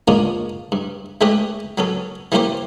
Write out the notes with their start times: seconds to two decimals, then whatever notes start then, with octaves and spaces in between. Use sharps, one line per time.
0.08 G#3 A#3 B3 C#4 D4 F4
0.72 G2
1.21 G#3 A3 C#4 G4 B4 D#5
1.78 F#3 B3 C#4 A4
2.32 E3 G3 A#3 C#4 G4 C5